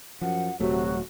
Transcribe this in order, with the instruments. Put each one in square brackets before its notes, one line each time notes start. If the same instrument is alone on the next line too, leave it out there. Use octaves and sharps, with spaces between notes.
[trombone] F#2 [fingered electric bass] F3 [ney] F#5
[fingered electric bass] D#1 A3 [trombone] C3 [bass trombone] F#3 [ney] F#4